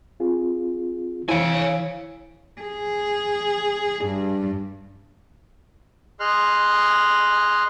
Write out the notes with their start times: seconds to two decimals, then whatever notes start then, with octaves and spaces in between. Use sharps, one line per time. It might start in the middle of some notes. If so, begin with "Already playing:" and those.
0.20 C4 F4 G#4
1.29 E3 E4 C5 C#5 F5 G#5
2.61 G#4
4.05 G2
6.20 G#4 D#5 C6 F6 F#6